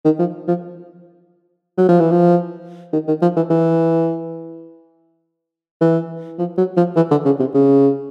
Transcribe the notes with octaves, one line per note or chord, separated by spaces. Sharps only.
D#3
F3
F3
F#3
F3
E3
F3
D#3
D#3
F3
E3
E3
E3
F3
F#3
F3
E3
D3
C#3
C3
C#3